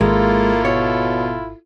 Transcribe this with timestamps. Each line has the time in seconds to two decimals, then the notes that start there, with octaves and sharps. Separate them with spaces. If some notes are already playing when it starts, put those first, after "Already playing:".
0.01 G#1 G#3 A#3 E4 F4 A4
0.65 B2 C#5